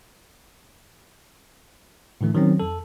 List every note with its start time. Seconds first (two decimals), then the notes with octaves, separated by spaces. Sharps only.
2.21 A2 D3 E3 A3
2.35 D#3 F#3 C4 C#4
2.60 F2 A4